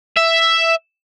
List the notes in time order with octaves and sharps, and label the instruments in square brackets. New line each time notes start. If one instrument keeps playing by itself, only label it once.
[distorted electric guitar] E5